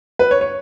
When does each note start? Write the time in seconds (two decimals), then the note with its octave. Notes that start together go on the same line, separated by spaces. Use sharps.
0.19 B4
0.31 C#5
0.41 C#5